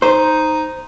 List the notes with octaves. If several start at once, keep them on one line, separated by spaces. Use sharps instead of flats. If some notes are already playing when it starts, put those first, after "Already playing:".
D#4 C5